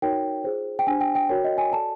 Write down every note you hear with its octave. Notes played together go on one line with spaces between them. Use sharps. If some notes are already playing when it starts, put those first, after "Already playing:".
D#4 F#4 A#4 C#5 G5
F4 G#4 C5
G5
D4 G4 C5 G#5
G5
G5
F#4 A#4 C#5 G5
D#5
G#5
F#4 A4 D5 A5